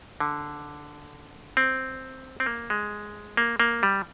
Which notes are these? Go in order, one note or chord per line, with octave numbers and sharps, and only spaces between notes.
D3
C4
C4
A#3
G#3
A#3
A#3
G3